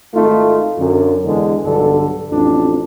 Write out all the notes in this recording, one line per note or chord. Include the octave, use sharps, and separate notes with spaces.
G#1 A3 D#4 F4
F#2 D3
E2 D3 G#3
B1 G2 D3 A4
A1 F2 F3 D4